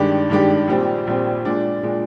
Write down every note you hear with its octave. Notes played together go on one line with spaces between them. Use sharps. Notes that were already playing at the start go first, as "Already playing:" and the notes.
Already playing: G2 D#3 G#3 D4 G4
G2 D#3 G#3 D4 G4
A#1 A#2 G3 C4
A#1 A#2 G3 C4
A#2 G#3 D4
A#2 G#3 D4